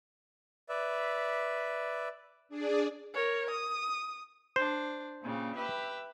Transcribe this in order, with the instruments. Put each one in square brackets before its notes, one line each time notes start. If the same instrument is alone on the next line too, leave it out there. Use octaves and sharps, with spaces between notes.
[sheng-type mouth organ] B4 D5 E5
[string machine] D4 G#4 D5
[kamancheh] A#4 C#5
D#6
[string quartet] D4 [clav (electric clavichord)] C5
[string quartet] A#2 C#3 G3
G4 B4 E5